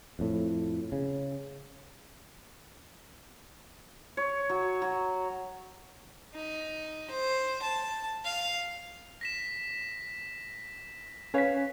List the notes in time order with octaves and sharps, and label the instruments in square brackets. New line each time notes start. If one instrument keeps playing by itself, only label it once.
[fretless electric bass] F2 A2
C#3
[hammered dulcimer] C#5
F#3
F#3
[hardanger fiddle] D#4
C5
A5
F5
[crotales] A#6 B6 E7
[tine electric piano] C#4 B6 [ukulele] B4 C#5 F5